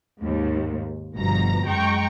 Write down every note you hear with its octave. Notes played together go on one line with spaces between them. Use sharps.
D#2 G#2
G1 B2 F3 A#5 A#6
F#2 G#3 G5 A#5 C#6